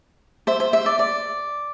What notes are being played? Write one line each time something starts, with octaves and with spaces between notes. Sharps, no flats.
C5 E5
C5 E5
C5 E5
D5
D5